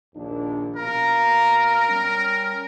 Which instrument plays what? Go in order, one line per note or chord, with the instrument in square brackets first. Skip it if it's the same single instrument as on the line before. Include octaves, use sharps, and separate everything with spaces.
[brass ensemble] A#1 D#2 D4
[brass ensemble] B2 F5 A#5 [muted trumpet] A#4
[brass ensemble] G3 C#4